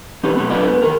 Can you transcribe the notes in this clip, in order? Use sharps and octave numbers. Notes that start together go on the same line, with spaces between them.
E3 C#4 D#4 G4 B4
B2 F#3 A3 B3
D3 F#3 F4 B4 D5 D#5
G#2 B3 B4
E2 D#3 A#4